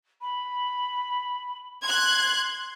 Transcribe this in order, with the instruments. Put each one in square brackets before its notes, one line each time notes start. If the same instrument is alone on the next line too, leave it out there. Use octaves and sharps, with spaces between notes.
[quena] B5
[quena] C6 [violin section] F#6 G#6